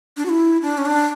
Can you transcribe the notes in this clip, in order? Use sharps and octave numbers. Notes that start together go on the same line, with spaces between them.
D4
F#4
E4
D4
C#4
D4